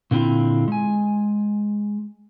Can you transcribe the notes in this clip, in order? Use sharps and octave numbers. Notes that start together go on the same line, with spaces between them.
A#2 D3 C4 E4 F4
G#3 G#5